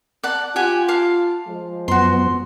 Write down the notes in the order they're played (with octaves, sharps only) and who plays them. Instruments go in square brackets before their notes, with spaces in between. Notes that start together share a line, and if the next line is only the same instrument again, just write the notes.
[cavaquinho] D5 F#5 A5
[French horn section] F4 [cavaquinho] G4 F#5 G#5
[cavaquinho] F5 A5 D6
[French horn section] F3 G#3
[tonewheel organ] F#2 B3 [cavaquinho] F#4 C6